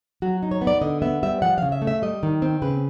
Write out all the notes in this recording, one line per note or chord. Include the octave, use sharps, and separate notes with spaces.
F#3 F#4
D#4
C#5
B3
D5
D3 D#5
B3 E5
G3 E5
F3 F#5
C#3 F5
E5
A3
E5
G3 D#5
D#3
C4
C#3 B4